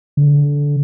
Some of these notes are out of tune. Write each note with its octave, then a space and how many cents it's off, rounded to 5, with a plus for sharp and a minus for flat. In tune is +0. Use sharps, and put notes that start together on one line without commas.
D3 -20